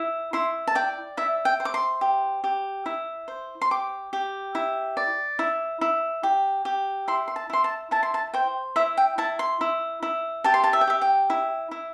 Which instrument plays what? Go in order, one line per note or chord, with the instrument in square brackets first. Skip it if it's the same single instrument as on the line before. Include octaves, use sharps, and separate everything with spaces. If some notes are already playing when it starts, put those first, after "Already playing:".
Already playing: [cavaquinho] E4
E4 C6
A5
D5 G5
E4 E5
G5
C5
D6
C6
G4
G4
E4
C5
C6
G4 D6
G4
E4
D5
E4
E4
G4
G4
E4 C6
C6
A5
E4 C6
A5
E4 A5
C6
A5
C5 G5
E4 E5
G5
E4 A5
C6
E4
E4
G4 A5
C6
A5
E5
G5
G4 E5
G5
E4
E4